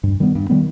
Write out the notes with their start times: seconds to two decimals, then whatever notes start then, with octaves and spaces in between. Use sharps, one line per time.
0.03 G2
0.20 D#3 G3 B3
0.35 G2
0.50 D#3 G3 B3